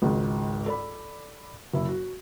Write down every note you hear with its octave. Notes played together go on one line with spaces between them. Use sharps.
G#1 C#2 G#2
A4 D5 B5
F#1 E4
F#4